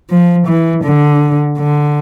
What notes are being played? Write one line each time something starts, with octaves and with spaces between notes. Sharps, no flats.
F3
E3
D3
D3